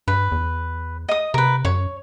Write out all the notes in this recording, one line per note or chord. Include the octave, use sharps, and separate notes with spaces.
G2 B4
E2
D#5 D#6
C3 A#4 B4
F#2 C#5